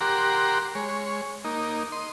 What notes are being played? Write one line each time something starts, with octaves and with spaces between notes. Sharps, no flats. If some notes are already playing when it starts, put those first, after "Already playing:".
G4 A#4 F#5 A#5 C6 D6
G#3 C#5
A#3 D#4
D#5 C6